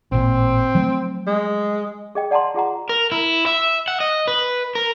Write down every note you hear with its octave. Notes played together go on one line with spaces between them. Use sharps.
A1 A#2 C4
F3 F#3 A3
G#3
G#4 D#5 G5
D5 F#5 A5 A#5 C6
F4 G#4 F#5 A#5
A#4
E4
E5
F#5
D#5
B4
A#4